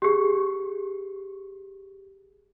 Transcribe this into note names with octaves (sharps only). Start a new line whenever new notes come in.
G4 G#4